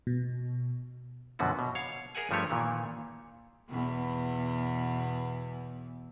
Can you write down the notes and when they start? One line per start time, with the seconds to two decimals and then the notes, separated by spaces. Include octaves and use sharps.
0.07 B2
1.39 F#2 B2 D3 F3 B3 F#4
1.59 B2
1.75 C#5 F5
2.15 G#4 A#4 E5 F#5 G#5
2.31 G2 F3 A3 G4 C#5
2.50 A#2 D#3 E3
3.69 E2 B2